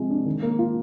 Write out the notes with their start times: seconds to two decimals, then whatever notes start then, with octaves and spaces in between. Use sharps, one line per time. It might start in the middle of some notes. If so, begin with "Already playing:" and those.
Already playing: C3 F3 G#3
0.10 D4
0.26 D#3
0.43 A#3
0.59 F4